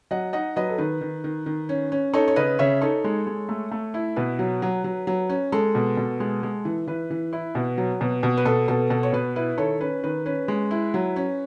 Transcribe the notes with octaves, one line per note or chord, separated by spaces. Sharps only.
F#3 D#5 F#5
D#4 D#5 F#5
F#3 B4 D#5
A4
D#3 B4
D#3
D#3
D#3
C#4
C#4
D#4 A4 C#5
C#5
C#3 B4 D#5
C#3 C#5 E5
D#4 A4 C#5
G#3
G#3
A3
A3
E4
B2 B4
F#3
F#3
F#3
F#3
C#4
G#3 A4
B2
B2
G#3
G#3
E3
E3 B4
E3
E4
B2
F#3
B2
B2
B4
B2 A4
B2 A4
B2 A4
C#5
B2 B4
E4 B4
D#3 A4 C#5
C#4 B4
D#3 B4
C#4 B4
G#3
E4
F#3
C#4